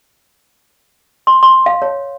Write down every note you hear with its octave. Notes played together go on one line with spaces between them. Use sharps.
C6
C6
F5
C#5